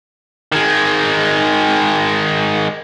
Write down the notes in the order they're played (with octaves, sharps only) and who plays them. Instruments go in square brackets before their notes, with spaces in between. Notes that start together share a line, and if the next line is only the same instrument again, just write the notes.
[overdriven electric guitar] D#3 G#3